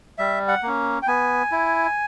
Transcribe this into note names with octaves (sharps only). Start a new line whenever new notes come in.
G3 E5
F#5
A#3 C#4
G5
B3 G#5
E4